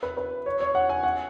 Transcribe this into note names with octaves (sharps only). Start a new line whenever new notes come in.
B4
B4
C#5
C#5
F#5
G#5
F#5